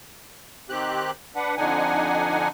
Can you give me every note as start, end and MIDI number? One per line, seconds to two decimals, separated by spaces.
0.70 1.11 51
0.70 1.11 60
0.70 1.11 67
0.70 1.11 90
1.36 1.55 62
1.36 1.55 71
1.36 1.55 78
1.57 2.48 41
1.57 2.48 50
1.57 2.48 62
1.57 2.48 63
1.57 2.48 78
1.57 2.48 80